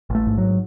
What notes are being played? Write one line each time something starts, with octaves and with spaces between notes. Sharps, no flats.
A1 A3
G#2
F#3